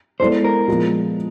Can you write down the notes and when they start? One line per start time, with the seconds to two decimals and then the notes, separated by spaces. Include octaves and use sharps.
0.20 G#3 B3 E4 A4 C5 D5
0.45 A#4
0.68 A#2 F3 G#3 B3